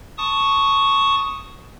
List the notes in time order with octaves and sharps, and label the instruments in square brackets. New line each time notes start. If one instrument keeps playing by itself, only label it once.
[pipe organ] A5 C#6 D#6